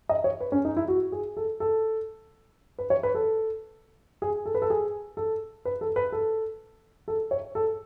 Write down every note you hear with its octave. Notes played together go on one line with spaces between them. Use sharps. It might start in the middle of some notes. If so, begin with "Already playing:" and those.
D#5
C#5
B4
C#4
D#4
E4
F#4
G#4
A4
A4
B4
C#5
B4
A4
G#4
A4
B4
A4
G#4
A4
B4
A4
B4
A4
A4
C#5
A4